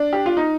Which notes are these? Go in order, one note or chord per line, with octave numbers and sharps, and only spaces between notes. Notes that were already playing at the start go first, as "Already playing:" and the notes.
Already playing: D4
G4
F4
D#4